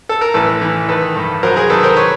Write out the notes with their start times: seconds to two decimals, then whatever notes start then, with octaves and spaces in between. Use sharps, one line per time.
0.09 A4
0.21 A#4
0.34 A1 A4 B4
0.61 E3
0.88 D#3 A4 B4
1.16 G2
1.43 F#3 A#4 C5
1.56 G#4 A#4
1.70 D#3 A4 B4
1.83 A#4 C5
1.97 B4 C#5